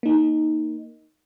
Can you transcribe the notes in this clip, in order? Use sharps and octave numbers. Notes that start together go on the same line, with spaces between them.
A#3 D#4